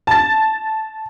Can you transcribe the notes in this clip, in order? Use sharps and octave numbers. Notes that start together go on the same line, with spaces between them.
A5 A6